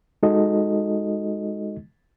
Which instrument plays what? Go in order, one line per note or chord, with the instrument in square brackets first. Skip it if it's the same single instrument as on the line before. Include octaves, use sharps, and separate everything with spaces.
[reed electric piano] G#3 D#4 F#4 A4 D#5